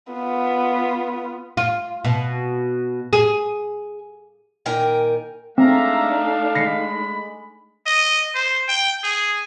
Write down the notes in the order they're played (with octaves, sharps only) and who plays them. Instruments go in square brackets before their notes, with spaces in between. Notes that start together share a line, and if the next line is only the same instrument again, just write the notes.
[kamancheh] B3 F4
[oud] F4
B2
G#4
[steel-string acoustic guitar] A#2 D#3 A#4 G5 G#5
[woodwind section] G#3 E5 A#5 [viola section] A3 D4 D#4 [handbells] C4 [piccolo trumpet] F5
[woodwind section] G#3 B5 [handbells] A#6 C7 C#7
[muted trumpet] D#5
C5
G5
G#4